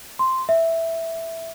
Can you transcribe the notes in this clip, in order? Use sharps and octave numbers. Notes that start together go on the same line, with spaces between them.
C6
E5